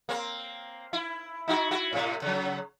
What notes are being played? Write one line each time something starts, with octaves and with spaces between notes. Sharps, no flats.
A#3 C4
E4
D#4 E4 F#4
E4 F#4
A2 C3
C#3 F#3